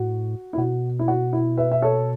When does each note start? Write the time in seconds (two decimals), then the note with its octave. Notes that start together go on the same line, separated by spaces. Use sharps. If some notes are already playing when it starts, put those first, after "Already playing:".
Already playing: A2 F#4
0.53 E4
0.57 B2 F#4
0.99 E4
1.08 F#4
1.33 E4
1.57 B4 E5
1.72 E5
1.82 A4 C#5